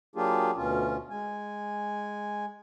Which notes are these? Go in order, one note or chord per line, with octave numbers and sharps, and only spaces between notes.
F#3 A#3 D4 F4 G4 G#4
D2 B2 C#4 F4
G#3 G#5